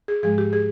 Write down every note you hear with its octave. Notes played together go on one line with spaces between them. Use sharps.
G#4
G#2 F3 G#3 G#4
G4
G#4